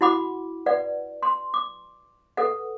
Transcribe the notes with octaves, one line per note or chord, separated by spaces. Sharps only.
E4 F#4 F#5 B5 D6
B4 D5 F#5
C6
D6
A4 B4 F#5